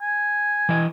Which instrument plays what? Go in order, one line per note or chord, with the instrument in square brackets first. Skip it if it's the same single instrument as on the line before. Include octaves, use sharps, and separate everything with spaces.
[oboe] G#5
[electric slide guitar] E3 D#5